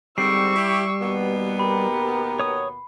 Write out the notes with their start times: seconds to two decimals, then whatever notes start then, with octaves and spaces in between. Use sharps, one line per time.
0.18 G#2 D3 G3 C4 C#6 E6 C7
0.56 E4 G4
1.00 D#2 B2 B3
1.59 G4 A#4 B5
2.39 C#5 D#6